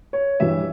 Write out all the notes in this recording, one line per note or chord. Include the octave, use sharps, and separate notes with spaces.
C#5
G2 E3 G3 E5